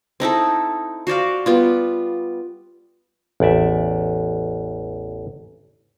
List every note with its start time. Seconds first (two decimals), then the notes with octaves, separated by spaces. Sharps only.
0.20 C4 D#4 E4 A4
1.07 F#4 C5 D5 F5
1.46 G3 B3 F4
3.40 A1 E2 D5 E5